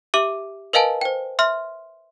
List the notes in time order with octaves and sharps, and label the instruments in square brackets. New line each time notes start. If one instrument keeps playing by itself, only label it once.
[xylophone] G4 E5 D6 F#7
A#4 B4 D#5 F5 G#5 A5
C5 G5
E5 C6 F6